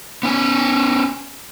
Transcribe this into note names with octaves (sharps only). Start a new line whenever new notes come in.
B3 C#4 G#5